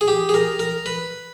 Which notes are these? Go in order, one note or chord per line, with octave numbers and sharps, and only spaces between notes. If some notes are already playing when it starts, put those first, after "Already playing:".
G#4
G4
G#4
A#4
A#4
B4